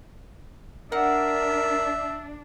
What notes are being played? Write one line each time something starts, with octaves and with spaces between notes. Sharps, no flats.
D4 A#4 E5 F#5